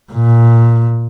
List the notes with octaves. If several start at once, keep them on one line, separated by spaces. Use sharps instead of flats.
A#2